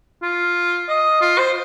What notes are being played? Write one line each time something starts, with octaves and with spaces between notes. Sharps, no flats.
F4
D#5
F4
C5